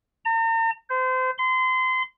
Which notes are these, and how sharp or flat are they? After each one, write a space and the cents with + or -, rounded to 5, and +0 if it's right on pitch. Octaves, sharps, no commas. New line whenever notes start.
A#5 -45
C5 -30
C6 -30